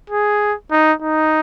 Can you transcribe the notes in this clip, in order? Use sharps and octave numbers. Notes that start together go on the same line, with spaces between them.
G#4
D#4
D#4